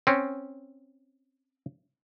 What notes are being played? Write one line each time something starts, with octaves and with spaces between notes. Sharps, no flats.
C4 C#4